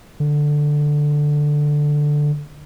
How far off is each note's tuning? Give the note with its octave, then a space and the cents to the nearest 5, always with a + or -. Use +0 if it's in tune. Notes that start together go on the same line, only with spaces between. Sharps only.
D3 +5